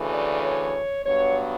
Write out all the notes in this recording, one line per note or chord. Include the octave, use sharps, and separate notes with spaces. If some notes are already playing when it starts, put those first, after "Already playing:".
Already playing: D2 C#3 E3
D5
C#5
G2 F#3 B3 C#5